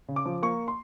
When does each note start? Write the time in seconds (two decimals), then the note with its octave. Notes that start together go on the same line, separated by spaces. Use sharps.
0.08 C#3
0.16 D6
0.25 F3
0.43 A#3 C#6
0.68 C6